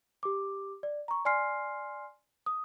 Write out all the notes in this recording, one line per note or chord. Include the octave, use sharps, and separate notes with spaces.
G4 D6
D5
A#5 C#6
D5 G#5 C6 F6 C7
D#6